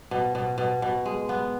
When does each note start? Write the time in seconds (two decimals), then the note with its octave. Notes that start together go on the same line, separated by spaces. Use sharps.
0.11 B2
0.35 B2
0.58 B2
0.82 B2
1.06 G#3
1.29 B3